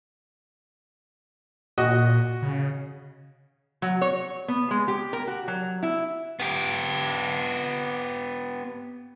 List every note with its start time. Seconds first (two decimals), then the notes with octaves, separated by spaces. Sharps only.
1.78 A#2 F#4 D#5
2.42 C#3
3.82 F#3
4.02 C#5
4.48 B3
4.71 G#3
4.88 G4
5.13 A#4
5.27 F#4
5.48 F#3
5.83 E4
6.40 B3 G4